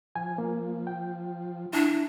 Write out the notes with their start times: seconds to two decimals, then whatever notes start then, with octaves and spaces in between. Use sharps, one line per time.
0.16 F3 G#5
0.38 A#3
0.87 G5
1.73 D4 E4